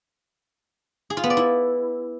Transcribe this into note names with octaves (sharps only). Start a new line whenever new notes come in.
G#4
F4
B3
D5
E4